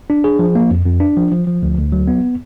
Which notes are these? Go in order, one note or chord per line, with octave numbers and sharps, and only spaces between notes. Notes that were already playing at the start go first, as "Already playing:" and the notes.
D4
G#4
F3
A#3
F2
F2
D4
F3
F3
F3
D2
D2
F#3
B3